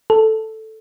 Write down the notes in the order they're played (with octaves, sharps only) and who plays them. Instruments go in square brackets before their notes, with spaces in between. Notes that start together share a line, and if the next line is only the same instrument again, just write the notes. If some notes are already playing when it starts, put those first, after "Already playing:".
[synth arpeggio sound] A4